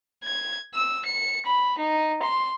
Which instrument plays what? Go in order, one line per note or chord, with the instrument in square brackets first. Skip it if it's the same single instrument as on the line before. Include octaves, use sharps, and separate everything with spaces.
[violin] G#6
E6
C#7
B5
D#4
C6